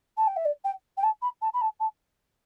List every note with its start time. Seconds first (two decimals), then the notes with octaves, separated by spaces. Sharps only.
0.17 A5
0.27 G5
0.36 E5
0.45 D5
0.64 G5
0.97 G5
1.03 A5
1.22 B5
1.42 A5
1.53 B5
1.61 A5
1.80 A5